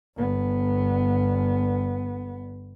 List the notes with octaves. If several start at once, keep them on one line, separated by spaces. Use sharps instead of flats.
G1 B3